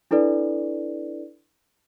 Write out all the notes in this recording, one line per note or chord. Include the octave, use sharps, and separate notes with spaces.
D4 E4 A4 B4 D5